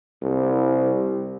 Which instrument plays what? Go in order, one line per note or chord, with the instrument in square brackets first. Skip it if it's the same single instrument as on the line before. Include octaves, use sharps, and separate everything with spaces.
[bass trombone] C2